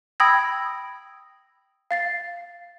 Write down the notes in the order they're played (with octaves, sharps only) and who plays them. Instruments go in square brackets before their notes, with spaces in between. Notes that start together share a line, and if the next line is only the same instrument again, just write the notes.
[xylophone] G5 B5 D#6 E6 G#6 A#6
F5 A6 C7